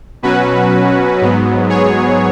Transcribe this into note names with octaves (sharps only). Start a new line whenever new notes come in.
B2 F#3 C#4 F#4 B4
G#2 F#3 B3
G#4 C#5